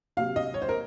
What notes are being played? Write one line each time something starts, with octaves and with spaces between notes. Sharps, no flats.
C3 F#3 A#3 F5
D#5
C#5
C5
A#4